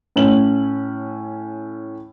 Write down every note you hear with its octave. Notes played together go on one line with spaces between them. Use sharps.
A2 C#4 F#7